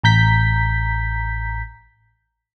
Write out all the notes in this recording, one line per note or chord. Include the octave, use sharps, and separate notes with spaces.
A1 A#5 G6 B6